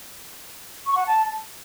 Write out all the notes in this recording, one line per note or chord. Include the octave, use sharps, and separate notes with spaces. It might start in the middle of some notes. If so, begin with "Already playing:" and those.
C#6
F#5
A5